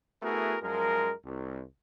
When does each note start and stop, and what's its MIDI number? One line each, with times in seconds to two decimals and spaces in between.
0.22 0.56 57
0.22 0.56 59
0.22 0.56 64
0.22 0.56 66
0.22 0.56 68
0.22 0.56 70
0.62 1.12 42
0.62 1.12 53
0.62 1.12 56
0.62 1.12 70
1.25 1.62 36